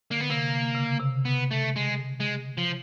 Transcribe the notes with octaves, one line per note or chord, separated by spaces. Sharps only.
D3 A#3
B3
C3 A#3
C#3
C3
B3
A3
G#3
G#3
F3